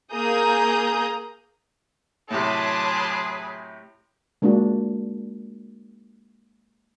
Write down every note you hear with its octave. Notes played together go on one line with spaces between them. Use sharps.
A#3 G#4 A#5 D#6 G6
A2 C3 F#3 G#4 B4 A5 C6 D6
G#3 A#3 D4 F4 F#4